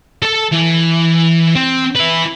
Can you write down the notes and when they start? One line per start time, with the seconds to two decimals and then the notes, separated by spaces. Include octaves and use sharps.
0.22 A4 A5
0.52 E3
1.56 C4
1.96 E4 B4